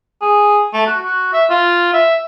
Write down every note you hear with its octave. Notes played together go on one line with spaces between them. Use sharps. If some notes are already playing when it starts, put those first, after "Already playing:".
G#4
A3
F#4
F#4
E5
F4
E5